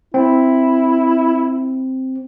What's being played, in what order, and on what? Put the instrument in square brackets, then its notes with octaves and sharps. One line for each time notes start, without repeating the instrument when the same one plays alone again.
[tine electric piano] C4 [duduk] E4